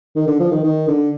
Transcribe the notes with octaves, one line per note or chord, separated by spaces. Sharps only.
D#3
D3
F3
D#3
D#3
D3